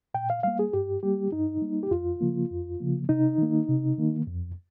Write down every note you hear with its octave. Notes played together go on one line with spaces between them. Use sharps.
A#2 G5
F5
G3 A#3 F5
G#4
G2 G4
G3 A#3 G4
G2 D#4
G3 A#3
G4
F2 F4
C#3 F3 A#3
F2
C#3 F3 A#3
C3 D#4
D#3 A#3
C3
D#3 A#3
F2